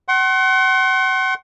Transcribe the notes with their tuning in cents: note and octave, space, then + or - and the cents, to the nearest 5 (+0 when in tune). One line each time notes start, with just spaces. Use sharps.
F#5 +35 C6 +30